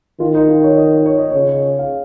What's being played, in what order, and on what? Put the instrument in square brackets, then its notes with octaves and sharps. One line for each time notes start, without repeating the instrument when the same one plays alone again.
[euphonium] D#3 [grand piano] F4
[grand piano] D#4
F4
C#5
D#5
C#5
D#5
[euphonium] C#3 [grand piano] C#5
[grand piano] F5